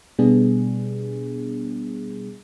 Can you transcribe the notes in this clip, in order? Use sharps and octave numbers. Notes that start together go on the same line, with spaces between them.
B2 G3 B3 D4 G#4